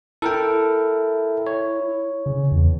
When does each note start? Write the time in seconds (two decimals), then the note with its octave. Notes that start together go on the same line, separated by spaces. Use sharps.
0.22 E4 A4 A#4 G5
1.47 C#5
2.26 C#3
2.52 E2